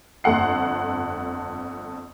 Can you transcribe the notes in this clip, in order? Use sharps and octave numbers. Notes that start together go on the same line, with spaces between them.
G1 F2 A4 F#5 C7